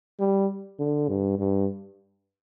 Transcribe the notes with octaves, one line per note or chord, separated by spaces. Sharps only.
G3
D3
G2
G2